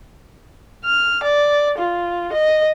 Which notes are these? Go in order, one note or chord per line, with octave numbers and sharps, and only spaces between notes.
F6
D5
F4
D#5